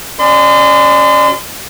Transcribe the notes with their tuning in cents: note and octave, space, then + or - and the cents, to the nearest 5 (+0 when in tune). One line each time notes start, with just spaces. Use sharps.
C#4 +0 D5 +35 C6 -35